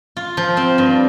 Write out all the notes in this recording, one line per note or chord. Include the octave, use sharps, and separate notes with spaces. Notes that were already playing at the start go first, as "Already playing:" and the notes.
F4
F3
C4
G2